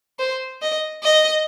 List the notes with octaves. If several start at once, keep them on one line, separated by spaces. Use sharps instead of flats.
C5
D#5
D#5